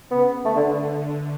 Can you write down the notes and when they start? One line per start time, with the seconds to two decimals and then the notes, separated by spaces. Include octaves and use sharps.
0.10 C#3 B3
0.45 D3 A3
0.56 D3